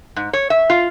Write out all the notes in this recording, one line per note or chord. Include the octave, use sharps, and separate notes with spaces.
G#2
C#5
E5
F4